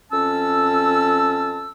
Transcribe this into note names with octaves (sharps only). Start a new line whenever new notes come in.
F2 C#4 A5 E6